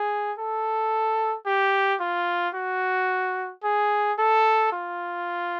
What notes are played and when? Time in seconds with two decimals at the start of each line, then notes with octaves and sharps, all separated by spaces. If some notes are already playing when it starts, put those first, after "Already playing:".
Already playing: G#4
0.38 A4
1.46 G4
2.00 F4
2.54 F#4
3.64 G#4
4.18 A4
4.72 F4